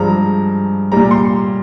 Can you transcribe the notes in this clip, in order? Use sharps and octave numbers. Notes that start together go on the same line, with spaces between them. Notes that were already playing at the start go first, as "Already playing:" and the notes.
Already playing: G2 F3 G#3 A#5
A#2 G3 A#5
C6